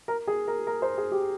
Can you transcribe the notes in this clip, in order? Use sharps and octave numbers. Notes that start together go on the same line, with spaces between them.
A#4
G#4
A#4
A#4
C5
G#4
G4